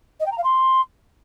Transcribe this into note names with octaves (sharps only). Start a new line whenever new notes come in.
D#5
G5
A#5
F5
C6